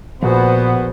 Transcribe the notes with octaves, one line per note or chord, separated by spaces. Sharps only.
A#1 A#2 B3 F#4 C5